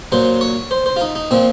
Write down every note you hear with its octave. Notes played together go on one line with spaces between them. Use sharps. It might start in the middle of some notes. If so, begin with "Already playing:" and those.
A#2 F#3 C5
C#5
C5
C5
F4
D#4
D#4
A#2 F3 C4